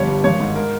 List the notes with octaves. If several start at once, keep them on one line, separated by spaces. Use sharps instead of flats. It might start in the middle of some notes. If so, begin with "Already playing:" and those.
Already playing: G1 G3 C#5
G2
G#1 C#5
G#2
A#4